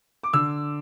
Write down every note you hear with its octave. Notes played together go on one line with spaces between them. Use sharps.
D6
D3 E6